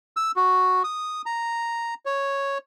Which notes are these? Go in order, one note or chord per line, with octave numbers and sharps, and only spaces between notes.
E6
F#4
D#6
A#5
C#5